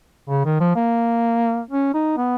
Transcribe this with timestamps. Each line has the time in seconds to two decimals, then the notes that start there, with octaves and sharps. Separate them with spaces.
0.29 C#3
0.45 D#3
0.61 F3
0.76 A#3
1.71 C#4
1.94 D#4
2.17 B3